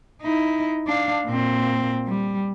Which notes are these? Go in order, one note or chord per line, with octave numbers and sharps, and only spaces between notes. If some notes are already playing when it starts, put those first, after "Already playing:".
D#4 E4
D4 F5
A#2 C4
G3